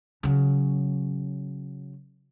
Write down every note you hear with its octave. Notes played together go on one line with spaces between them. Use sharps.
C#3 F#3